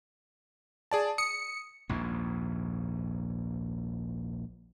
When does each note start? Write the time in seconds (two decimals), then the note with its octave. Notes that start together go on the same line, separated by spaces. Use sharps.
0.91 G#4 D5 A5
1.18 D#6 C#7
1.89 A#1 D#2 G#2